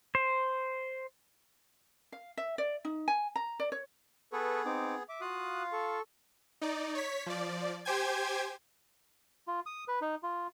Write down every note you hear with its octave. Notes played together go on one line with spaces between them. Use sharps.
C5
F5
E5
D5
D#4
G#5
A#5
D5
C#5
B3 G#4 A4 B4 C#6
C4 D#4 D6
E5 D6
F4 F#4 F5 D#6 F#6
A4 C#6
D#4 D5
C#5 B6
F3 D5
G4 C5 G5 G#5 G#6
F4
D#6
B4
D#4
F4